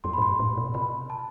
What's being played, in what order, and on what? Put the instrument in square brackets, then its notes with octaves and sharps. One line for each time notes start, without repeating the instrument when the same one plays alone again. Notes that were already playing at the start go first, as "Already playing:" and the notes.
[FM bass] F#2 [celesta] C6
[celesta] B5
[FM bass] A2
[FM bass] G2 [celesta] C6
[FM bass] A2
B2
[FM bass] C3 [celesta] B5
[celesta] A5